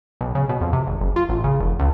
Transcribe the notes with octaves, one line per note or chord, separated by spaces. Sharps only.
B1
C#3
B2
F2
C3
G#1
F#1
F4
A1
C#3
F1
C#2